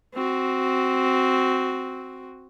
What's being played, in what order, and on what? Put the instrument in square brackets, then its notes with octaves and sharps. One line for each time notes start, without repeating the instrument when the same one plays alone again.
[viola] C4 F#4